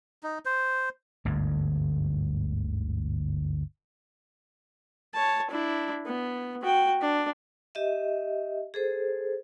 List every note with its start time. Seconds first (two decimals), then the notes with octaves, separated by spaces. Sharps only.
0.23 D#4
0.45 C5
1.25 G1 D2 G#2
5.14 C#5 A5
5.50 D4 E4
6.06 B3
6.62 F#4 G5
7.01 D4
7.75 G4 D#5 E5
8.74 G#4 A4 C5